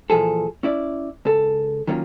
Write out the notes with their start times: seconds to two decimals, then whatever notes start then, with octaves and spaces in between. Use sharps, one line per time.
0.10 A#2 E3 F3 G#4 A4
0.63 C#4 E4 D5
1.25 C#2 A4
1.87 D#3 F#3 A#3 C#4 F4